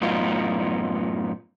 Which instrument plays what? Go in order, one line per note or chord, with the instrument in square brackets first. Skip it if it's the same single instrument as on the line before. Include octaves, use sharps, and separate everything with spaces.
[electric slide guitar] F#2 A2 B3 D#4 F4